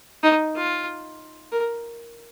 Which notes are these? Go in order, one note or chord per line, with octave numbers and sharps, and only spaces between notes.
D#4
F4
A#4